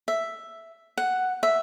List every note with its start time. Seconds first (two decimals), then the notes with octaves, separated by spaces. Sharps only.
0.08 E5
0.98 F#5
1.43 E5